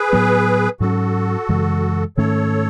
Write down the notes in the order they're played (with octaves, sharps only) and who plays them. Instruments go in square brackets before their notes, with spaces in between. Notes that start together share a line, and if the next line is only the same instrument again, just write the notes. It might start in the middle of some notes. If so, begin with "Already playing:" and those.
Already playing: [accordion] G#4 B4
[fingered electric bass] A2 F#3 B3
[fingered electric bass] G#2 F#3 C#4 [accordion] F#4 A4
[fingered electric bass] F#2 C#3 E3 G#3
[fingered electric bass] G#2 D#3 A3 C#4 [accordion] A4 C#5